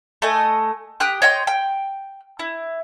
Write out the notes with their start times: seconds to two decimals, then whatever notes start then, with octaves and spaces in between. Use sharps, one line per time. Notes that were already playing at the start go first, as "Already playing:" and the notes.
0.22 A3 D#5 G#5
1.00 G4 G5 D#6 F#6
1.22 C#5 D#5 G5 C6
1.47 G5
2.39 E4